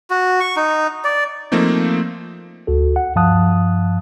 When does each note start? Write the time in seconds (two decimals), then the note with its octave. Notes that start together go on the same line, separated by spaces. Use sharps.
0.10 F#4
0.40 C#6
0.56 D#4
1.05 D5
1.52 F3 A3 A#3 C4 D#4
2.67 D2 F#4 A4
2.96 F#5
3.16 G2 F3 F5 A5 D#6 F#6